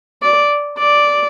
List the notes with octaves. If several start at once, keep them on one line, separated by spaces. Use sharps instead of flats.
D5
D5